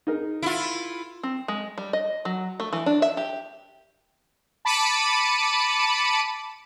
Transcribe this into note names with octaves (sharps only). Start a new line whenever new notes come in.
D#4 G#4 A#4
E4 F4
C4
G#3
G3
D#5
F#3
A3
E3
D4
E5
G4
A5 B5 D6 C#7 D#7